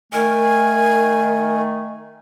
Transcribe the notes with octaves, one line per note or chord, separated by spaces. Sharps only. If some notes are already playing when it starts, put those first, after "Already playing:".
D#3 A3 A#4 G#5